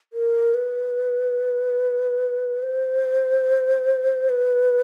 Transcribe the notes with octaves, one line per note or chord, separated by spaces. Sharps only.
A#4
B4
C5
B4